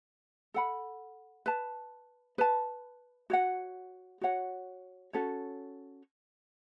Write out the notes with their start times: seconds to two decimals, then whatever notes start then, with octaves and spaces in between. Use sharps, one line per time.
0.54 A4 F#5 B5
1.46 B4 A5
2.38 B4 A5
3.30 F#4 C#5 F#5
4.21 F#4 C#5 F#5
5.13 C#4 F#4 A4 C#5